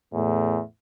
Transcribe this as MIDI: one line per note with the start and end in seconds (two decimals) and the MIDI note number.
0.13 0.60 40
0.13 0.62 45